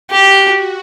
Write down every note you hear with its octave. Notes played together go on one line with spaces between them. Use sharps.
F#4 G4